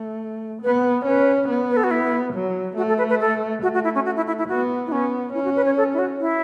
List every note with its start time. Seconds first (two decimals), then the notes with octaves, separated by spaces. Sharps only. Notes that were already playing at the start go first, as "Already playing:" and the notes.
Already playing: A3
0.62 B3 B4
1.06 C#4 B4
1.49 B3
1.70 B4
1.77 A4
1.84 F#4
1.91 E4
2.34 F#3
2.77 A3 F#4
2.88 A4
2.98 B4
3.10 B4
3.21 A4
3.63 A3 F#4
3.74 F#4
3.84 E4
3.95 C#4
4.05 F#4
4.16 E4
4.27 E4
4.38 E4
4.49 B3 F#4
4.87 E4
4.92 B3 C#4
5.34 C#4 E4
5.44 F#4
5.56 B4
5.66 C#5
5.77 A4
5.94 E4
5.99 F#4
6.20 E4